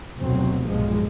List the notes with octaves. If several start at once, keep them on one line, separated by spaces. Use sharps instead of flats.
F1 D2 B2 F#3 C4
B1 G2 A#2 F3 G#3